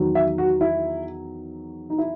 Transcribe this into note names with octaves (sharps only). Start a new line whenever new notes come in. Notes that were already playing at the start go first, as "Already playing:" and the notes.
Already playing: E2 D#3 F#3
E5
F#4
E4
D#4
E4